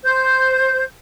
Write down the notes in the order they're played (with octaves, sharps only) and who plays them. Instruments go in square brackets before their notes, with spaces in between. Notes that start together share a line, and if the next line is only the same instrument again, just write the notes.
[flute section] C5 G6